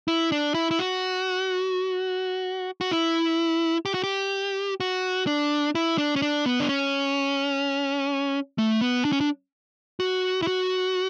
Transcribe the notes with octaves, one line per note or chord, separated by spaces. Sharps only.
E4
D4
E4
E4
F#4
F#4
E4
G4
F#4
G4
F#4
D4
E4
D4
C#4
D4
B3
D4
C#4
A3
B3
D4
C#4
D4
F#4
E4
F#4